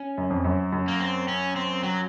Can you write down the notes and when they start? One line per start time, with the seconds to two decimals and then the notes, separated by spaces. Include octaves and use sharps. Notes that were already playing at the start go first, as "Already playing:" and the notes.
Already playing: C#4
0.18 F#2
0.30 F2
0.44 F#2
0.72 F#2
0.88 A#3
1.00 C4
1.28 C#4
1.56 C4
1.83 F#3